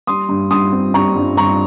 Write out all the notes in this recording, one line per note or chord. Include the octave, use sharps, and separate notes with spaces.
G3 C6 D#6
G2
G2 C6 D#6
C4
G3 A#5 C#6
G2
G2 A#5 C#6